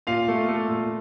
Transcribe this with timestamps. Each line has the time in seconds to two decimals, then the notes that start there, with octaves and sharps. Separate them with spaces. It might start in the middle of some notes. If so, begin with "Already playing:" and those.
0.07 A#2 F4 F5
0.28 A3
0.48 A3
0.69 A#2